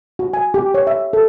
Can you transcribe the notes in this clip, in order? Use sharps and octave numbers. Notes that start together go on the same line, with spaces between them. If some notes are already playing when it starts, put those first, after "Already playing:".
F#4
G#5
G4
C#5
E5
A4